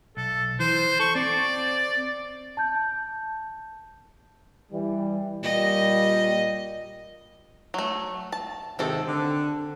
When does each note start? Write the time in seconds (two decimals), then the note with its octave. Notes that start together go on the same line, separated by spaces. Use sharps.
0.17 B1 A4
0.60 E3 C5
1.00 A4 C#6
1.15 C4 D5
2.57 A5 G6
4.72 E3 G3
5.43 A#2 G3 D#5
7.74 F#3 A3
8.32 A5
8.79 G#2 C3 D#3 C4 A4
9.06 D3